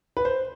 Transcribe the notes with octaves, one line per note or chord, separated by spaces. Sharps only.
B4
C5